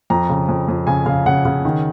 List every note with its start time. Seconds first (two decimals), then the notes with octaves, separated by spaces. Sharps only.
0.10 F2 A#5
0.29 C#3
0.49 F2
0.68 F2
0.87 C#3 G#5
1.06 C#3 F5
1.26 C#3 F#5
1.45 C#3
1.65 D#3